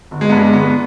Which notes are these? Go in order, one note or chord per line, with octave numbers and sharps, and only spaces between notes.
G1
G#3
G2 B3
G#3
G1 B3